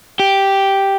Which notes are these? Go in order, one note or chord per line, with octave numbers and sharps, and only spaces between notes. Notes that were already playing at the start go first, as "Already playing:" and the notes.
G4